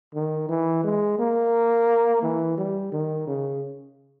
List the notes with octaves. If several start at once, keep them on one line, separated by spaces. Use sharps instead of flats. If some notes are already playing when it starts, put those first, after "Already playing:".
D#3
E3
G#3
A#3
E3
G3
D#3
C#3